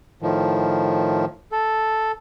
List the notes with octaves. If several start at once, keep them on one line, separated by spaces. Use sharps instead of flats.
A2 D#3 F3
A4